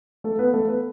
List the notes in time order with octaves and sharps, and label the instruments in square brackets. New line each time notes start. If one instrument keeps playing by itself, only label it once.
[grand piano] A3 A4
B3 B4
A3 A4
B3 B4